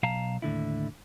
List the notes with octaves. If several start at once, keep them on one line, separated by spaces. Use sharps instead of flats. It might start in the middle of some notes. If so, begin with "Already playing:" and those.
B1 F5 A5 A#5
D#2 A2 D3 E4